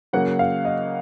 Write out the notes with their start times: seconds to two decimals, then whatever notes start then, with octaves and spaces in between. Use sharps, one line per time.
0.13 C#3 F#3 A#3 F#5
0.39 F5
0.65 D#5